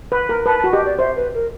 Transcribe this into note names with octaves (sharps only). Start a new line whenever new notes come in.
B4
A#4
B4 A5
A5
F#4
G4 D#5
D5
C5 E5
B4
A#4